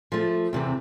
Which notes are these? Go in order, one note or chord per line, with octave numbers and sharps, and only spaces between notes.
F3 A3
E2 C3 E3 C4